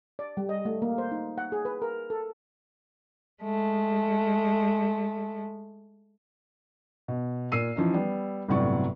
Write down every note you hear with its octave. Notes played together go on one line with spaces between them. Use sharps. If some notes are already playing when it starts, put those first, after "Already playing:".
D5
G3
D#5
A3
A#3
C5
D#4
F#5
G#4
B4
A#4
A4
G#3 A3
B2
A#2 E6 C7 D#7
E3 F3 C#4 D#4
G3 B3
G1 A2 C3 F#3 D5 C#6